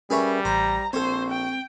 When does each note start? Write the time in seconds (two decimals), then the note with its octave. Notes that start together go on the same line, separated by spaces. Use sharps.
0.10 G3 C#4 G#4 A#4 B4 C#5 E5
0.45 A1 C5 A#5
0.93 A#1 C4 A4 C5 C#5
1.30 G5